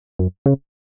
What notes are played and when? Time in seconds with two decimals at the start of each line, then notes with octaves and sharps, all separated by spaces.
0.19 F#2
0.46 C#3